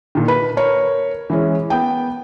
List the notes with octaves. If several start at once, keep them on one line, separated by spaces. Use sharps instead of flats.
A#2 D#3
B4
A#4 C#5
E3 G#3 C#4
B3 G5